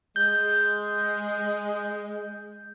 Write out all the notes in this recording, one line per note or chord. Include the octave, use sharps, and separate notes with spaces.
G#3 G6